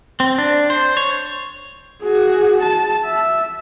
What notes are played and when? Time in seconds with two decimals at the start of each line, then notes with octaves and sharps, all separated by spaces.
0.20 C4
0.38 D4
0.70 C5
0.97 C#5
2.02 F#4 G#4
2.62 A5
3.05 E5